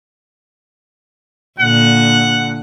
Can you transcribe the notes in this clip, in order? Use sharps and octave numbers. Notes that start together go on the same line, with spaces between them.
A#2 D3 F#5